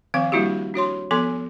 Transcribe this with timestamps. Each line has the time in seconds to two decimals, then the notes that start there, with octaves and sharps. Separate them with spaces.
0.14 D#3 F3 C4 F5
0.32 G3 A#3 D4 E4 F#4 G4
0.74 D4 F#4 C#5 C6
1.11 F3 B3 A4 G#5 C6